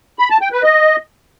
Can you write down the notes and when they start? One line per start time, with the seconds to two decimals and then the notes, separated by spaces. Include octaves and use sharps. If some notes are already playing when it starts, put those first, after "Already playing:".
0.19 B5
0.30 A5
0.41 G5
0.52 B4
0.63 D#5